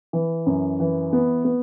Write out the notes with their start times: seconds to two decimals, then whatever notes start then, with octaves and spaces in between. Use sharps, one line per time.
0.13 E3
0.46 F#2
0.80 E3
1.13 B3
1.45 B3